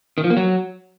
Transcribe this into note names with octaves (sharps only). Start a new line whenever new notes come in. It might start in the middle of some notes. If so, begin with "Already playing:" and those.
D#3
F3
A#3
F#3